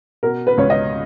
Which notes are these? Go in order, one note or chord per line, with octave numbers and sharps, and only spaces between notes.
B2 A#4
B4
C#2 C#5
D#5